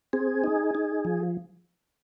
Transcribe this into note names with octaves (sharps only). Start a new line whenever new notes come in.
C4 G#4
D#4
D#4
F3